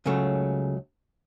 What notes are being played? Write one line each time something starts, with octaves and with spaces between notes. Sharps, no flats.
C#2 C#3 F#3 A3